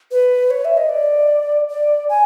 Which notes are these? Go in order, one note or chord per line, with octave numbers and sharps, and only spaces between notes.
B4
C#5
E5
D#5
D5
D5
G#5